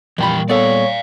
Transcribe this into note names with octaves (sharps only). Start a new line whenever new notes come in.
F2 A#2 E3 G3 G5 B5
B3 A4 C#5 D5 F5